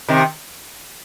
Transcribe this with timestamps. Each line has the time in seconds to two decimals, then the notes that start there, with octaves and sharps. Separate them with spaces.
0.09 C3 D#3